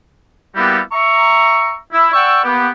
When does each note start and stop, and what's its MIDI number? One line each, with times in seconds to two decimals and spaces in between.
0.56 0.80 55
0.56 0.80 58
0.56 0.80 59
0.56 0.80 64
0.56 0.80 66
0.56 0.80 67
0.92 1.75 76
0.92 1.75 82
0.92 1.75 85
1.93 2.08 64
2.13 2.40 74
2.13 2.40 78
2.13 2.40 79
2.13 2.40 85
2.13 2.40 88
2.44 2.69 58
2.44 2.69 59
2.44 2.69 67